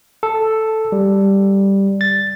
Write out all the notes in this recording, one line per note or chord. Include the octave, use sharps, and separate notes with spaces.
A4
G3
A6